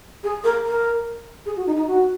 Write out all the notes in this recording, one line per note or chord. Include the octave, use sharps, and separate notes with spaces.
G#4
A#4
A#4
G#4
F#4
D#4
D#4
F#4